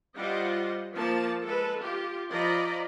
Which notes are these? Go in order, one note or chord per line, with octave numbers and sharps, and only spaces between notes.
G3 F4 C5 D#5 F#5
F3 A#3 A5
G#3 A4 B4
F4 G4
F3 D5 D#5 A#5 B5